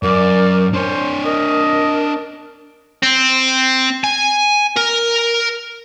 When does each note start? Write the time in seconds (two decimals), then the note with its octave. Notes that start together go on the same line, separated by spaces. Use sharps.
0.03 F#2 A#4 D5
0.74 D4 C5 C#5
1.25 A#4 D#5
3.03 C4
4.04 G#5
4.77 A#4